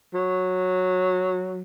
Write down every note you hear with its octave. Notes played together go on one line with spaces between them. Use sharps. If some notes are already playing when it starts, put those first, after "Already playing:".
F#3